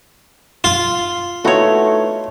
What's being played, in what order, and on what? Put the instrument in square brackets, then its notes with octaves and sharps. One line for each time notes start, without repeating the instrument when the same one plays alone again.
[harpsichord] F4
[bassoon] A3 [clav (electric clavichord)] B3 D#4 E4 [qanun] F#4 C#5